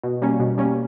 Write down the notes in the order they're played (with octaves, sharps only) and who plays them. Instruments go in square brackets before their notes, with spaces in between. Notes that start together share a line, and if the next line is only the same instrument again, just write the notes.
[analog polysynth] B2
G3 A#3 C#4
B2
G3 A#3 C#4